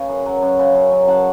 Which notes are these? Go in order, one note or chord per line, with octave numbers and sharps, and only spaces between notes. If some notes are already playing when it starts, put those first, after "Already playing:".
Already playing: C#3
F#2
F#3
F#2
C#3
F#2
F#3
F#2 F#5 A5